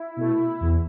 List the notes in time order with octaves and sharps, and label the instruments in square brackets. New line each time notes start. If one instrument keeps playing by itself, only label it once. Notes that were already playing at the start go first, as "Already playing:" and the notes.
Already playing: [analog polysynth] E4
B2 A3
E2